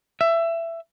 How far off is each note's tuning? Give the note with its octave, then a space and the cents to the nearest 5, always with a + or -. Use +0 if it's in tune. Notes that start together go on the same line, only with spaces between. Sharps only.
E5 +20